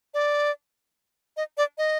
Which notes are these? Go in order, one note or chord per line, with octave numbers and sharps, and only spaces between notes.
D5
D#5
D5
D#5